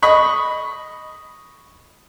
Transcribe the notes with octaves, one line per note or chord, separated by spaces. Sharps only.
D#5 B5 C#6